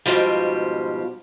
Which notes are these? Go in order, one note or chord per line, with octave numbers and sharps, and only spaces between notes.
G#2 B2 F3 G3